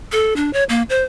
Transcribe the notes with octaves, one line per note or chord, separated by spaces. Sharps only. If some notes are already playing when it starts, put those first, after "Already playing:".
A4
D4
C#5
A#3
C5